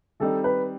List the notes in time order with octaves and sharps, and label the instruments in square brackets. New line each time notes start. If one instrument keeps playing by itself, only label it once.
[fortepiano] D#3 G3 C4 D#4 [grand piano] A4
[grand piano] B4